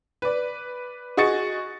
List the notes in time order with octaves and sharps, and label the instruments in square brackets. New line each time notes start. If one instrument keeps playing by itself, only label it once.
[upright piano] B4 D5
F#4 G#4 D#5 C#6 A6 C#7